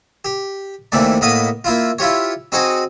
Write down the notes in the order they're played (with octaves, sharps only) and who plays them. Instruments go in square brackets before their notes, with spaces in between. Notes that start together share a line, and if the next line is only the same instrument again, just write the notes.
[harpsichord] G4
D#2 C3 E3 A3 D5
A2 A#3 B3 D#5 D#6
A#3 E4 F4
E4 F4 G4 C#5
C4 D#4 F#4 G#4